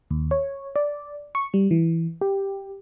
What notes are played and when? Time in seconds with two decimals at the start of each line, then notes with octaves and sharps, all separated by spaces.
0.11 D#2
0.31 C#5
0.76 D5
1.35 C#6
1.54 G3
1.71 E3
2.21 G4